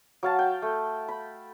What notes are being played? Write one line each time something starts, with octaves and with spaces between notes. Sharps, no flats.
F#3 F5 A5
G5
A3
B5